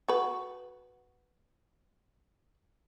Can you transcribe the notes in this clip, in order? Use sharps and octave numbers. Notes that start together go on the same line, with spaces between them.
F#4 B4